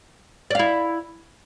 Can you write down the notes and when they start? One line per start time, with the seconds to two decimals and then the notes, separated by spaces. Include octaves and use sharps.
0.50 D5
0.55 F5
0.59 E4